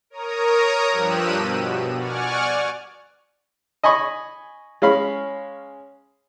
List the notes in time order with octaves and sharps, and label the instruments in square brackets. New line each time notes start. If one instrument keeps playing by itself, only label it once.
[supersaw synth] A#4 C#5 A#5 D#6
G2 F3 G4 E6 F#6 D#7
B2
D5 F#5 G#5 C#6 F6
[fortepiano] D#5 G#5 B5 C#6 D#6
G#3 C#4 F5 B5